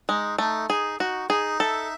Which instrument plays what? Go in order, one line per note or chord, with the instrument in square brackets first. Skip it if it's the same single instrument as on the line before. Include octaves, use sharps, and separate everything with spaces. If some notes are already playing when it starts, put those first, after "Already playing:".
[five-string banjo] G#3 [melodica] D#4
[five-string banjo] A3 [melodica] D#4
[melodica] D#4 [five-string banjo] G#4
[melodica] D#4 [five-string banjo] F#4
[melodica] D#4 [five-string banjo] G#4
[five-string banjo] A4 [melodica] E5